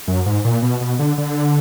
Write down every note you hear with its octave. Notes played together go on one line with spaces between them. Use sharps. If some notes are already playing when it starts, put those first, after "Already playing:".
F#2
G#2
A#2
B2
B2
D3
D3